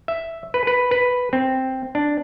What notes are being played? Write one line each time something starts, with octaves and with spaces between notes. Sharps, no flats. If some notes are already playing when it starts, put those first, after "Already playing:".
E5
B4
B4
B4
C4
D4